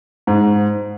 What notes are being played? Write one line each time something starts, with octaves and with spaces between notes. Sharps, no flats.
G#2